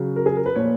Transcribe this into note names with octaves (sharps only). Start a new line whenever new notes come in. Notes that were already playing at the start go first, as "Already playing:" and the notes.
Already playing: C#3 F#3
A#4
G#4
A#4
B4
A#2 F3 C#5